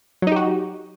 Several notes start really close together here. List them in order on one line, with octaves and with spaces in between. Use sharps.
F#3 D#4 G4 F#4